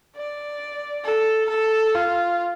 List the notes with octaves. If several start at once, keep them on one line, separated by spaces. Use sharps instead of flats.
D5
A4
A4
F4